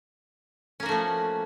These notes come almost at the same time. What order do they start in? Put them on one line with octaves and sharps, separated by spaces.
C#4 A#3 F#4 A3 F3